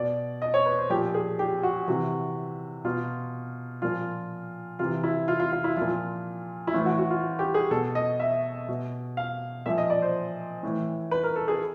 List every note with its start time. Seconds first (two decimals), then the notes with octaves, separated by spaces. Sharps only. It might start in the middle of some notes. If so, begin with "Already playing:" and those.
Already playing: B2 D5
0.42 D#5
0.54 C#5
0.66 B4
0.78 C5
0.90 A#2 F3 G4
1.14 G#4
1.39 G4
1.63 F#4
1.88 C3 E3 F#4
2.85 B2 F4
3.82 A#2 F3 F4
4.79 C3 E3 F4
5.03 E4
5.28 F4
5.40 F4
5.52 F4
5.64 E4
5.77 A#2 F3 F4
6.67 E4
6.74 A2 E3 F4
6.86 F#4
6.98 F#4
7.10 F4
7.39 G4
7.54 G#4
7.71 B2 A4
7.95 D#5
8.20 E5
8.69 B2
9.17 F5
9.66 A#2 F3 E5
9.78 D#5
9.90 D5
10.02 C5
10.63 A2 E3
11.11 B4
11.24 A#4
11.36 A4
11.48 G#4